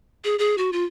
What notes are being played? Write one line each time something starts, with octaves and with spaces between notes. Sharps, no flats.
G#4
G#4
F#4
F4